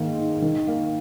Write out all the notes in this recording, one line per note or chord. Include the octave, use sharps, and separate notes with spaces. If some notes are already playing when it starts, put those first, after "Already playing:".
Already playing: G#2 D#3 A#3
D#4
D#3
A#3